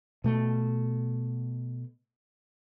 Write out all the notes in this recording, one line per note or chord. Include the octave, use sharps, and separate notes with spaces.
B2 A3